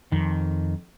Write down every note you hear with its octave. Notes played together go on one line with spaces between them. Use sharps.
F2 D#3